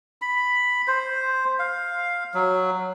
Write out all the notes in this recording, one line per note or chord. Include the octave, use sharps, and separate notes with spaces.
B5
C5
F5
F#3